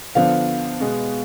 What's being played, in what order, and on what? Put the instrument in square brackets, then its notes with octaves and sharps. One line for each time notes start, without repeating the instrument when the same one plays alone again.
[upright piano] D3 F3 B3 D4 [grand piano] F5
[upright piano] B2 G#3 B3